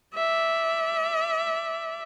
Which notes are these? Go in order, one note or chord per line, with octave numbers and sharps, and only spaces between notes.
D5 E5